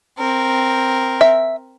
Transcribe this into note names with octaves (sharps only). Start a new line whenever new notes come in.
C4 A#4
E5